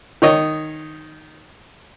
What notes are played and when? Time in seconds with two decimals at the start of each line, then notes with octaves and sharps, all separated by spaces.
0.22 D#3 C#5 D#5